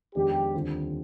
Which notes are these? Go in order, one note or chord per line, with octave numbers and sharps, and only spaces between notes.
F2 D#3 G#3 B3 D4 G4
D#2 D3 G3 C4 F4